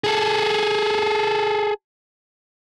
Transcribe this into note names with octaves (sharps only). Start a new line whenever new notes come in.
G#4 A4